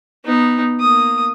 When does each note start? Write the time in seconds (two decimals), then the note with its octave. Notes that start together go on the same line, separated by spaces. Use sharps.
0.25 B3 D#4
0.80 A#3 D#6